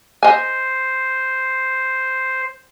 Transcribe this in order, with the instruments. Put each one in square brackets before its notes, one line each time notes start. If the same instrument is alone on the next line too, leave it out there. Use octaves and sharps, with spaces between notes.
[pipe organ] C5 [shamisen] D#5 G#5